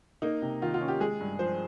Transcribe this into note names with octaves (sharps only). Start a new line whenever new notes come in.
A#3 D#4
C3
D#3 F4
F4
C#4
G4
G#3 G#4
G2
F3 C5